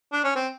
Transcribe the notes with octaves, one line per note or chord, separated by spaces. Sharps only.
D4
C#4
C4